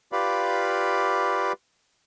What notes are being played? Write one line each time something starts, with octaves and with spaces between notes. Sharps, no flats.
F4 G4 B4 D5 F5 B5